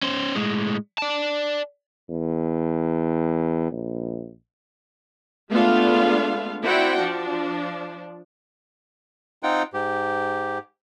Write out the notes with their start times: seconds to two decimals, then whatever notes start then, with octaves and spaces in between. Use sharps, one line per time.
0.03 C#4 C5
0.36 A2 G#3
0.98 D5 A5
2.09 E2
3.72 A#1
5.50 G#3 A3 B3 D4 F4 F5
6.63 C4 E4 F#4 D5 F#5 G5
7.00 F3 D4
9.43 C4 D#4 F4 F#5 G5
9.74 G#2 G4